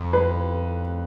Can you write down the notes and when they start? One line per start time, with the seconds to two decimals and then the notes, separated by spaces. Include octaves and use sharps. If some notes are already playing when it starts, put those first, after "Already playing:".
Already playing: F2
0.13 B4